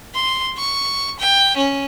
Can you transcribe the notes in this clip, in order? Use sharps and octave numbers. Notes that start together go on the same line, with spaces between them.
C6
C#6
G5
C#4